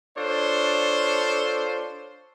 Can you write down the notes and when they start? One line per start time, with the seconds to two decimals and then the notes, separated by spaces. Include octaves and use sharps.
0.17 D4 F4 A4 C5 C#5